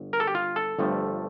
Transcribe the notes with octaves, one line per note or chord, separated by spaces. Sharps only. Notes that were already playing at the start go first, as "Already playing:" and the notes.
Already playing: G1
A#4
A4
G4
F4
A4
G1 G2 F3 A3